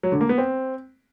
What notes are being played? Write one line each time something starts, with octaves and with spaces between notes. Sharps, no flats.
F#3
D3
A#3
B3
C4